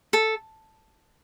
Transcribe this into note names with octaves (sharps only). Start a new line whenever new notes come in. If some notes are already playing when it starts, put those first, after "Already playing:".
A4